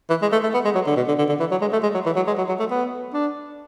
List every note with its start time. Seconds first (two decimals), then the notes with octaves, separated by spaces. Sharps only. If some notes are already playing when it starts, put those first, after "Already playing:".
0.10 E3
0.22 G#3
0.32 A3
0.44 A3
0.54 B3
0.65 G#3
0.75 F#3
0.87 D3
0.97 B2
1.08 D3
1.19 D3
1.29 D3
1.40 E3
1.51 F#3
1.62 G#3
1.73 A3
1.83 G#3
1.94 F#3
2.06 E3
2.16 F#3
2.27 G#3
2.38 F#3
2.49 F#3
2.60 A3
2.71 B3
3.14 D4